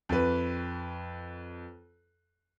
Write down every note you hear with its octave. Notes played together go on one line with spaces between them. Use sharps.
F2 B4